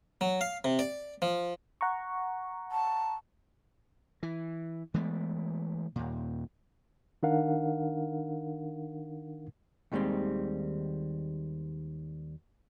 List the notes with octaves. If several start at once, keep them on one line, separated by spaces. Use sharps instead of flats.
F#3
F5
C3
D5
F3
F#5 A#5 C#6
A5
E3
E3 G#3 A3 B3
D#2 A#2
D#3 D4 D#4 A#4 F5 F#5
D#2 D#3 G3 G#3 C4